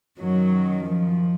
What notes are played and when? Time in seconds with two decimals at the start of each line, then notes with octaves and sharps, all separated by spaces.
0.18 F#2 D#3 F#3
0.85 F3